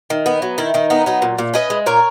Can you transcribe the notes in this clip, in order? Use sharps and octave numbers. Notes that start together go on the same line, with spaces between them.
D#3
B3
F#3
D#3 E4
D#3 D#4
B3 D#4
F#3 D#4
A#2
A#2
C#4 B4 D#5
G#3
A#2 A#4 C#5